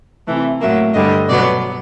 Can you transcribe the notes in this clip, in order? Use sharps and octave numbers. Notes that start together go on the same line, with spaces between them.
C3 E3 A3
A2 F#3 A#3 E5
G2 D3 G3 D#5
B2 F#3 B3 D5